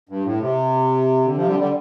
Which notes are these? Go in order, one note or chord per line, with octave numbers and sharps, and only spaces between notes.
G2
A2
C3
D3
C3 F3
D3 G3
D3 G3